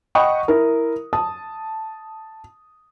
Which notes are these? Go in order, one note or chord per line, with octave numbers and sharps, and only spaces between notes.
D#5 F#5 G5 B5 C#6 D#6
E4 A#4
A5 D#6